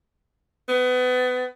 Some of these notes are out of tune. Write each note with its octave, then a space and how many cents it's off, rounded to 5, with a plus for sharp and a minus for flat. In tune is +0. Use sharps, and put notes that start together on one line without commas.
B3 +30